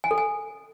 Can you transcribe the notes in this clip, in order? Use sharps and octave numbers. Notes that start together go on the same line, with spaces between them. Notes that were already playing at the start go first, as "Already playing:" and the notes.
G#5
A4
G#5